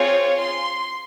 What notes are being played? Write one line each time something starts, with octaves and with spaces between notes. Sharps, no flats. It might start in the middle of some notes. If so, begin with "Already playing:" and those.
Already playing: C4 F4 G#4 C#5
C6